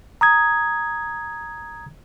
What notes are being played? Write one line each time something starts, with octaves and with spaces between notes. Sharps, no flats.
A#5 D#6 G#6